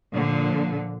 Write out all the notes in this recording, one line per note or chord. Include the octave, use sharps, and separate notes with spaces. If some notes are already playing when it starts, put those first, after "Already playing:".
A#2 D3 F3